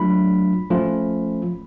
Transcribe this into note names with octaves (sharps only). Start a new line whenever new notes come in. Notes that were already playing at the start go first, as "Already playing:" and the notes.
Already playing: F#3 A3 D4 F4 B5
F3 A3 C#4 F4